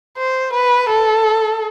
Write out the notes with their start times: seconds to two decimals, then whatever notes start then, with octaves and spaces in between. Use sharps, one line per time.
0.17 C5
0.53 B4
0.89 A4